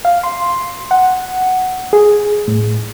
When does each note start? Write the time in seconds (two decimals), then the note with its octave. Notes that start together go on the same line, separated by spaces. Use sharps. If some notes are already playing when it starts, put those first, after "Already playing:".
0.05 F5
0.23 C6
0.91 F#5
1.93 G#4
2.48 A2